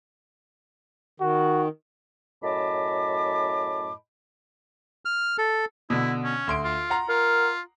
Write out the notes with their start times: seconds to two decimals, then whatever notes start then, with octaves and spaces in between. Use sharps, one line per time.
1.20 D#3 F#4
2.43 F#2 A2 D#5 A5 B5 D6
5.05 F6
5.38 A4
5.90 B2 D3 E4
6.23 C#4
6.47 D2 C6 D7
6.64 F4
6.90 F#5 A#5 C6
7.09 F4 A#4